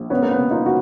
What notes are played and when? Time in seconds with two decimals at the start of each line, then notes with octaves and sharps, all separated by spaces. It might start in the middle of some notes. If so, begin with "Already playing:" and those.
Already playing: A#1
0.10 E1 B3 C#4
0.22 A#3
0.31 B3
0.38 C#3
0.50 D#4 F4
0.64 C#3 F#4